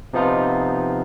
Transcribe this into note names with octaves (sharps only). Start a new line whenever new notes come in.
C3 F3 B3 D#4 F4